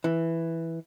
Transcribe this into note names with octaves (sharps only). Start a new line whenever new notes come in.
E3